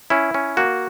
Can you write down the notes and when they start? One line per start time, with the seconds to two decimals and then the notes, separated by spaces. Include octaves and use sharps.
0.10 C#4 E4
0.34 C#4
0.57 A#3 F#4